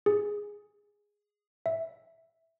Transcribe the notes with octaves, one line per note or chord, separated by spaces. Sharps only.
G#4
E5